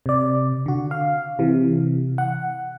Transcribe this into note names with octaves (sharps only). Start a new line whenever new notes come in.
C3 D5
D3 F#4
F5
C3 E3
F#5